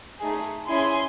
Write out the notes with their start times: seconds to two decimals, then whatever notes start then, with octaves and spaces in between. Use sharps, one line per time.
0.20 A3 D#4 G#4
0.68 C#4 E4 G#4 G#5 C6